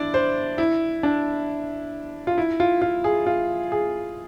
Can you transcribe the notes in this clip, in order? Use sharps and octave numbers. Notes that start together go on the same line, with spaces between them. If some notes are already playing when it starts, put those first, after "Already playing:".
Already playing: D4 E4 D5
C5
E4
D4
F4
E4
F4
F4
G#4
F4
G#4